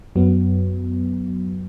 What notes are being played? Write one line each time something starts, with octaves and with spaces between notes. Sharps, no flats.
F#2 F#3 B3